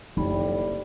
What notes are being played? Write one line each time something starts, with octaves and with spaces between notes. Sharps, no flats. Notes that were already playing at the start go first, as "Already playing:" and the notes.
F#1 F2 A2 G3 D#4 B5